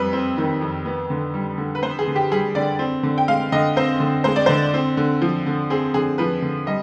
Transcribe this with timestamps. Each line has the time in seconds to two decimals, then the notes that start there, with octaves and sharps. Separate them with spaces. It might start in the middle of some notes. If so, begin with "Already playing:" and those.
Already playing: F2 G3 C4 B4
0.13 C4
0.38 D#3
0.61 F2
0.85 B3
1.10 D3
1.34 G3
1.58 D3
1.75 B4
1.83 B3 C5
1.99 G#4
2.07 D3
2.16 G4
2.31 G3 G#4
2.55 D3 D5
2.79 C4
3.03 D3
3.18 G5
3.28 G#3 F5
3.52 D3 D#5
3.77 C4 C5
4.00 D3
4.24 G#3 C5
4.36 D5
4.46 D3 C5
4.74 C4
4.97 D3
5.22 F3
5.46 D3
5.70 C4 G#4
5.94 D3 G#4
6.18 F3 B4
6.42 D3
6.67 G3 D#5